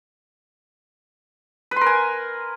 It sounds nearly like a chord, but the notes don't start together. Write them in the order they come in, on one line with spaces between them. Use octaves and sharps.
B4 C6 A#4 G#5